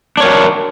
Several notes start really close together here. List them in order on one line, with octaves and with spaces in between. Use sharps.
D4 C#5 A#4